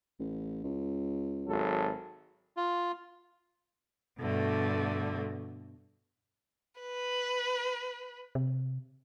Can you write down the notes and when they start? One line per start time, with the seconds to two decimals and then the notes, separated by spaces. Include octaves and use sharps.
0.19 A1
0.64 C#2
1.48 G#1 F#3 A4
2.57 F4
4.18 G2 B2 D3 A3
6.81 B4
8.35 C3